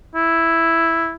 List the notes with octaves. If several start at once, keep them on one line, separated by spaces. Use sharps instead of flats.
E4